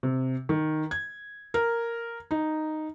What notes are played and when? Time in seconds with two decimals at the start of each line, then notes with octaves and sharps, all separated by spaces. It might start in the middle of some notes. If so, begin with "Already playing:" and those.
0.03 C3
0.49 D#3
0.91 G#6
1.54 A#4
2.31 D#4